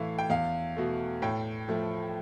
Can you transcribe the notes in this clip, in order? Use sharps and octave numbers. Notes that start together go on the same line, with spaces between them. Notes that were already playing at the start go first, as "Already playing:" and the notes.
Already playing: A2 E3 A3 F5
G5
E2 F5
B2 A3
A2 G5
F3 A3